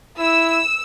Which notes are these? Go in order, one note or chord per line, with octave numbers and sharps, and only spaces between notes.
E4 E6